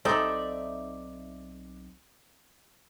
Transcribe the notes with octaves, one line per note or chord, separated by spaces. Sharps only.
B1 C4 D#4 A4 D5 E5